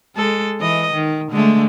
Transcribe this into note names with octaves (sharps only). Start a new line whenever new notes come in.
G#3 A4
E3 D#5
D#3
D3 G#3 A3